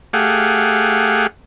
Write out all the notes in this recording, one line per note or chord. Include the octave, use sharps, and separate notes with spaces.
A3 G4 G#4 F5 F#5